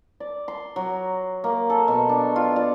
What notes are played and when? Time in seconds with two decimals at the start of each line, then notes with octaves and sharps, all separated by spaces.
0.20 D5
0.48 C6
0.76 F#3
1.44 A#3
1.70 A4
1.88 B2
2.09 D4
2.36 F4
2.56 D5